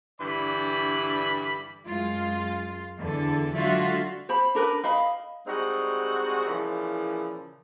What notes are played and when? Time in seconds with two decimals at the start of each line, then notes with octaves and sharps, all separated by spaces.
0.20 G2 D3 E3 D5 B5
1.86 F#2 G#3 F4
2.99 E2 D3 A4
3.56 D3 F#3 G#3 F4 F#4 E5
4.29 C5 B5
4.55 D4 A#4 B4 B5
4.84 D#5 F5 B5
5.47 G3 G#3 C4 D#4 F#4
6.46 A#2 C#3 E3 F3